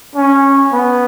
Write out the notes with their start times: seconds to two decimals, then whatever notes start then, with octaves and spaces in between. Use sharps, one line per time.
0.16 C#4
0.72 B3